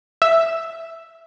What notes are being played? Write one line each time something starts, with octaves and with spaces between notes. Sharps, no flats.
E5